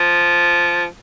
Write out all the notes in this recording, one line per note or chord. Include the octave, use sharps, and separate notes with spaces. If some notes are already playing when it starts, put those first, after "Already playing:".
Already playing: F3